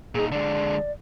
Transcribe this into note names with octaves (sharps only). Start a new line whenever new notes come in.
A#2 D#4 G#4
D3 G#3 D5